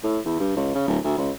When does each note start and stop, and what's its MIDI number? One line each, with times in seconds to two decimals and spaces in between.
0.04 0.19 45
0.25 0.40 40
0.40 0.54 43
0.56 0.71 37
0.75 0.84 49
0.87 0.99 26
1.05 1.17 38
1.18 1.31 37